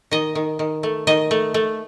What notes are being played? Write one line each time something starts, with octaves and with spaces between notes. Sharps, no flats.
D#3 D#5
D#3
D#3
A3
D#3 D#5
A3
A3